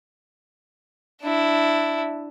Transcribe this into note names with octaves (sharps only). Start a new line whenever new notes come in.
D4 E4